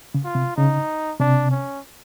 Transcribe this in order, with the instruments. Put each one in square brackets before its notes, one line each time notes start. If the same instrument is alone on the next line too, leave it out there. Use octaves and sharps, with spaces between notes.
[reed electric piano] C#3
[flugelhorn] F4
[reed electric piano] C3
[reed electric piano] C#3 [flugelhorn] D#4
[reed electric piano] C3 [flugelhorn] D4
[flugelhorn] C#4